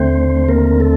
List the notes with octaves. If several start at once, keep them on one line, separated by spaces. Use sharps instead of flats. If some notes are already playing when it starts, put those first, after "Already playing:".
Already playing: D#2 D3 A3 C4 C5
A#3 A#4
A3 A4